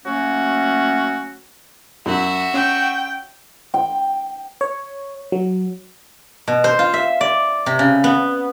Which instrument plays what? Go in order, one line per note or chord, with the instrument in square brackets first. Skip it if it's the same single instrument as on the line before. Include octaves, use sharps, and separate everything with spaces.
[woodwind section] F#3 A3 A#3 C#4 F#4
[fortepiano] F#2 [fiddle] F#4 E5
[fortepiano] C#4 [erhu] G5
[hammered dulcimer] G5
[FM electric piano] C#5
F#3
[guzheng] B2
C5
F4
E5
D5
C3
C#3
B3